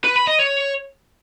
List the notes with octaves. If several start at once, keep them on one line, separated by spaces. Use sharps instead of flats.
B4
B5
D#5
C#5